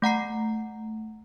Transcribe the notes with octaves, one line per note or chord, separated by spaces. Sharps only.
A3 F#5 A#5 C7